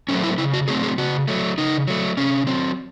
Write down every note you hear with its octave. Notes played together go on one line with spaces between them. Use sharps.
F#3 A3 C4 C#4
E4
C#3 E4
F#4
F#3 A3 C4 G#4
G#4
C#3 F#4
F#3 A3
C#3 D#4
F#3 A3
C3 C#4
F#3 C4